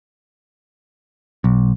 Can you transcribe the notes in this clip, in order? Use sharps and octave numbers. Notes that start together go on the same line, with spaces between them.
B1